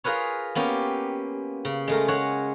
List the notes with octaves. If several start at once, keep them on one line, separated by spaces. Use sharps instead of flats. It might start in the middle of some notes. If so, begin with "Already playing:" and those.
F4 G#4 A#4 B4 C#5
A#3 B3 C#4 G4
C#3
G#3 A3 A#4
G#3 C#5 F#5